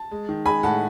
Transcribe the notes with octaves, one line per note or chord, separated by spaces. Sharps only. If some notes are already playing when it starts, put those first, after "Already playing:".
Already playing: A5
G#3
D#3
G#3 G#5 B5
A2 F#5 A5